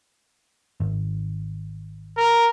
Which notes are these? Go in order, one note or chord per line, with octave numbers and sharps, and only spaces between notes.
G#1
A#4